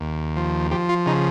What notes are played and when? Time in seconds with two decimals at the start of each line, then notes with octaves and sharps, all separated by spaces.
0.01 D#2
0.36 F3
0.71 F3 G4
0.89 F4
1.06 C#3 D#4